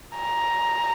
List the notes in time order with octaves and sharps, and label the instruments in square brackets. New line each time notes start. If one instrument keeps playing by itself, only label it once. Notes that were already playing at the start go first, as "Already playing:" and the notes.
[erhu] A#5